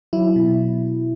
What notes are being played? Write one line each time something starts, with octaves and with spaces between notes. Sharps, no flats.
F#3 E4
B2